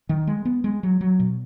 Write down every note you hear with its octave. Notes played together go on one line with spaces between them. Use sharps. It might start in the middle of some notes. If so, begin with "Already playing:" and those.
D#3
G#3
B3
G#3
F#3
F#3
B2